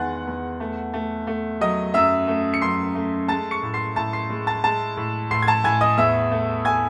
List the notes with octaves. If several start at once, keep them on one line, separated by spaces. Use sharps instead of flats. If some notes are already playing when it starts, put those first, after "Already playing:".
Already playing: E2 D#3 G#3 F#5 G#5 F#6 A6
E2
A3
A3
A3
F#3 D#5 D#6
F#2 E5 E6
A3
C#7
F#2 C6 C7
A3
G#3 A5 A6
C#6 C#7
A2
C6 C7
A2 A5 A6
C6 C7
G#3
A5 A6
G#3 A5 A6
A2
A2 C6 C7
G#6
A5 A6
A2 G#5 G#6
D#5 D#6
E2 E5 E6
A3
A3 G#5 G#6